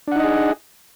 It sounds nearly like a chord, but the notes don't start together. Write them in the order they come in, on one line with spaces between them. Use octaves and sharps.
D4 F#5 D#4 D#5 G#4